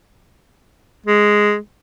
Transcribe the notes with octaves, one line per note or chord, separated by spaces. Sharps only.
G#3